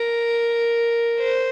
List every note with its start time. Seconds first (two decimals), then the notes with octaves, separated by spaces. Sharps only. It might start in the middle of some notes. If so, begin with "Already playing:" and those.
Already playing: A#4
1.21 C5